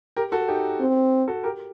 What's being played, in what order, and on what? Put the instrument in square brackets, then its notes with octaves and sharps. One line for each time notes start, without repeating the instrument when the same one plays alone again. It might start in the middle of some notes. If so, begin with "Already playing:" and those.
[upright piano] G4 A#4
F#4 A4
D#4 G4
[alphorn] C4
[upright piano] F#4 A4
G4 A#4